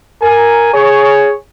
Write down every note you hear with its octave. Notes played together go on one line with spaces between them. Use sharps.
A#4 G#5
G#4 C#5